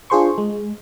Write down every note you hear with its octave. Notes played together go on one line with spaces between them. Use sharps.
D4 F4 G#4 C5 C6 C#6
G#3